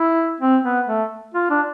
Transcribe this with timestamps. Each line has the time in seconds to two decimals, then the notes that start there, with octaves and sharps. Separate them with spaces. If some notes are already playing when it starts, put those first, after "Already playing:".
Already playing: E4
0.40 C4
0.64 B3
0.87 A3
1.34 F4
1.50 D4